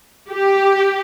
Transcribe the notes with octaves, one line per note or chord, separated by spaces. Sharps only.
G4